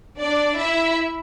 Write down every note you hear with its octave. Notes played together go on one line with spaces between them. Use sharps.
D4 D5
E4 E5